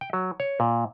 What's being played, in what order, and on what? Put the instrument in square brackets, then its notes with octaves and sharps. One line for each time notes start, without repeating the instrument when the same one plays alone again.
[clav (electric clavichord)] G5
F#3
C#5
A#2